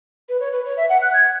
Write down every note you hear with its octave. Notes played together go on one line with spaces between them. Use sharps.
B4
C#5
B4
C#5
E5
F#5
F#6
G#6